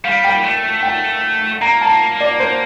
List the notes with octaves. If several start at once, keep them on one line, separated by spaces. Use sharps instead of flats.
G3 F5
G5
A3
G5
A#3 A#5
A5
D5
C5